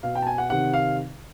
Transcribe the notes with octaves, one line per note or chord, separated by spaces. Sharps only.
B2 F5
G5
A5
G#5
F#5
C3 D#3 F#5
F5